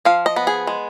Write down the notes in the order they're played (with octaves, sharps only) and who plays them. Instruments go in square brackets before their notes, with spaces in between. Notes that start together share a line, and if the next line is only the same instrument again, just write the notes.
[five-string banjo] F3 F5
D#5
B3
G#4
G#3